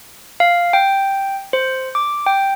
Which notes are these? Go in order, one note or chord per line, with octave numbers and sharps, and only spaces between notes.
F5
G5
C5
D6
G5